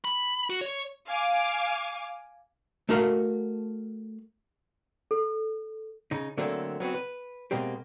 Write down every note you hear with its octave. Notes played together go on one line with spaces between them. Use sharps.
B5
F#4
C#5
F5 G#5 D6
A3 F#4 A#4 F5
A4
C#3 D#4
D3 F#3 A3 A#3 C4
F#3 B3 C4 F#4
B4
B2 G#3 A#3 C4 G4